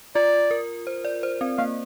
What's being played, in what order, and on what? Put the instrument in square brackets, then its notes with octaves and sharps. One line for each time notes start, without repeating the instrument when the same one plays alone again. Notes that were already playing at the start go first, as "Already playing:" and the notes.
[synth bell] F4 [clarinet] D5
[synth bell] A#4
C5
D5
C5
C4
[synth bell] A#3 [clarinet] F5